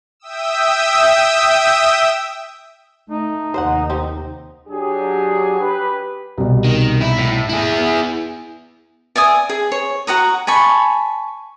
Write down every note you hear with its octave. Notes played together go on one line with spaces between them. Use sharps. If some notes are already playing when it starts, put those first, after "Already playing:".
E5 G5 D#6 E6
A3 D#4
D#2 C3 C5 D#5 F#5
C4 G4
F#3 D4 G4 G#4
G4 B4
C2 B2
D#3
E4
A2
E4 G#4
B3
D5 E5 G#5 D#6
G#4
C#5
F#4 F#5 A#5 D#6
G#5 A5 B5 C#6